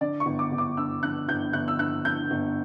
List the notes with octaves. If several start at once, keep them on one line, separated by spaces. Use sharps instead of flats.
D3 D5
C#6
G1
D6
G1
D6
G2 E6
D3 F#6
G1 G6
G1 F#6
E6
G2 F#6
D3 G6
G1